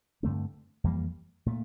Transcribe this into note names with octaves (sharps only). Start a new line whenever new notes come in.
G2 D3 A3 C4
F2 E3 G3 A#3
A#2 A3